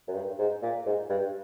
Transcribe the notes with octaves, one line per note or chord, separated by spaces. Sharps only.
F#2
G2
G#2
A#2
G#2
G2